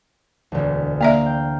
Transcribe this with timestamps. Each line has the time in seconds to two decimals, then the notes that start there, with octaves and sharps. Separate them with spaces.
0.52 E1 D2
1.01 A#3 D5 E5 F5 A#5
1.26 G5